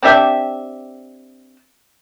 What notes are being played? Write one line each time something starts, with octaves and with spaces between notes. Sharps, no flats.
C4 D4 G4 E5